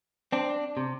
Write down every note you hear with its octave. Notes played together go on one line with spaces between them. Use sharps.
C4 D4
C3